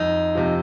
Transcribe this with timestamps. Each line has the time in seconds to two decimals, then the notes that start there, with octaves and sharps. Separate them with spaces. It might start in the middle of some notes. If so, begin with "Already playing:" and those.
Already playing: F2 D#4
0.35 C3 F3